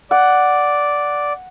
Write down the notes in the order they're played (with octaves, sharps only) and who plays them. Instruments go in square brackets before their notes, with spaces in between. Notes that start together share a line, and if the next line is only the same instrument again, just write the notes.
[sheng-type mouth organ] D5 [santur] F#5